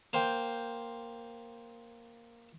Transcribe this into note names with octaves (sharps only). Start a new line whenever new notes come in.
A#3 C5 G5